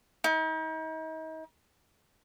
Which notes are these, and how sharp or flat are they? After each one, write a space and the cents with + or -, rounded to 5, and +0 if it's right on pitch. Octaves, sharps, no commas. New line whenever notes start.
D#4 +40